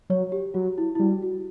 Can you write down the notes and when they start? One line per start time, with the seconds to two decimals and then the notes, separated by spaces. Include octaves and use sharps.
0.10 F#3 C#5
0.32 G4
0.54 F#3 F#4
0.78 E4
0.95 E4
1.00 G3 F#4
1.23 F#4